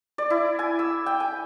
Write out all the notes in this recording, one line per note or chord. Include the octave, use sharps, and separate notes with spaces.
D5
E4
G#5
E6
G5
G#5